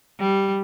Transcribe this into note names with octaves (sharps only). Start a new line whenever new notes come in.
G3